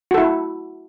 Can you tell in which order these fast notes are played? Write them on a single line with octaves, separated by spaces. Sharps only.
F#4 A4 E4